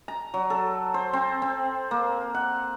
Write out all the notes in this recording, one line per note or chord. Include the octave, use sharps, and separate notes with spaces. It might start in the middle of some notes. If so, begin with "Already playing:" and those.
A#5
F#3
A4
C5
C4
C4
A#3
F#5